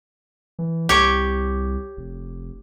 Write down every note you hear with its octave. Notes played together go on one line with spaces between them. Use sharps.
E3
C2 G4 C#5
F1